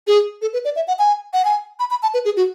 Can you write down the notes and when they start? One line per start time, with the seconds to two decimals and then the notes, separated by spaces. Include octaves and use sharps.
0.07 G#4
0.42 A4
0.53 B4
0.65 D5
0.76 E5
0.88 F#5
0.99 G#5
1.33 F#5
1.45 G#5
1.79 B5
1.91 B5
2.03 A5
2.14 B4
2.25 G#4
2.37 F#4